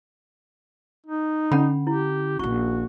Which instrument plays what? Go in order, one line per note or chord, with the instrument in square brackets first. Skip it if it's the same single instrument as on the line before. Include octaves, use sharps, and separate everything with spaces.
[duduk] D#4
[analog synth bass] D3 [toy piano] C#4 F#5 B5
[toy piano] E4 [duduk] G4
[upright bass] A#1 E4 [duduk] F#4 [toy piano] C#6